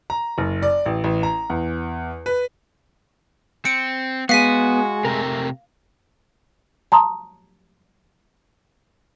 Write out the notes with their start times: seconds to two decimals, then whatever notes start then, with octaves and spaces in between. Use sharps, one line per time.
0.10 A#5
0.38 F#1
0.62 D5
0.86 A1
1.04 A1
1.23 A#5
1.50 E2
2.26 B4
3.65 C4 C#7 D7
4.29 G#3 B3 F#4 F5 B6 D#7
5.05 C3 A3 A#4
6.92 A5 A#5 C6 D#6